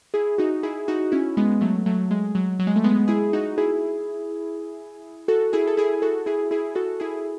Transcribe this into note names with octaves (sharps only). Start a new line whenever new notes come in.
E4 G#4
D#4 F#4
E4 G#4
D#4 F#4
C#4 E4
G#3 B3
F#3 A3
F#3 A3
G#3
F#3
F#3
G#3
A3
G#3 B3
E4 G#4
D#4 F#4
E4 G#4
F#4 A4
E4 G#4
A4
E4 G#4
F#4 A4
E4 G#4
E4 G#4
F#4 A4
E4 G#4